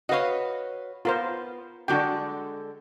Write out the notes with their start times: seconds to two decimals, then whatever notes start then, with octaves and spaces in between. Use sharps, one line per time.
0.09 F#4 B4 C#5 D#5 F5
1.05 B3 F4 A#4 C5
1.88 D3 G#3 D4 F#4 A4 G5